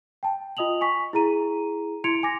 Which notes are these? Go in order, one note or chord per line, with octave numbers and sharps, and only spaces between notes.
G5 A5
F4 D#5 D#6 F7 F#7
G#5 C#6 B6
E4 G#4 A#5 D#7
E4 C6 G#6 C#7 D7 F7
G#5 D6 A#6